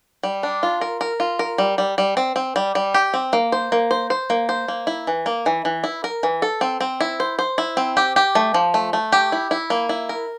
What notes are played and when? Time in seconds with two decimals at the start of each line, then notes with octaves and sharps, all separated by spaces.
0.23 G3
0.43 D4
0.63 F4
0.81 A#4
1.01 A#4
1.20 F4
1.39 A#4
1.58 G3
1.78 G3
1.98 G3
2.17 C4
2.36 C4
2.56 G3
2.75 G3
2.94 G4
3.14 C4
3.33 A#3
3.52 C5
3.72 A#3
3.91 C5
4.10 C5
4.30 A#3
4.49 C5
4.68 A#3
4.87 E4
5.07 E3
5.26 A#3
5.46 E3
5.65 E3
5.84 E4
6.04 A#4
6.23 E3
6.42 A4
6.61 C4
6.81 C4
7.00 E4
7.20 C5
7.39 C5
7.58 E4
7.77 C4
7.97 G4
8.16 G4
8.35 A3
8.54 F3
8.74 A3
8.93 A3
9.12 G4
9.32 E4
9.51 E4
9.70 A#3
9.89 E4
10.09 A#4